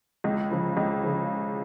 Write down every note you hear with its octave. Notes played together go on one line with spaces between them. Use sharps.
C#2
C#3 F3
C#2
C#3 F3